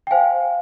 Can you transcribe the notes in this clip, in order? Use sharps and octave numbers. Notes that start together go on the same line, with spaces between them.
G5
C5 F5 G#5